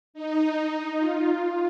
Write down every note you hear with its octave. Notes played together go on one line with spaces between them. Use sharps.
D#4
F4